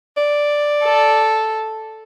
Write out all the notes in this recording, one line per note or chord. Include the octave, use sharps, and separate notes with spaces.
D5
A4